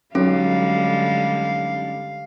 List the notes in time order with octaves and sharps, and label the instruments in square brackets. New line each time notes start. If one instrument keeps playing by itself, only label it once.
[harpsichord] B1 [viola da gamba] D3 G3 G#3 [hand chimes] C#4 [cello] F5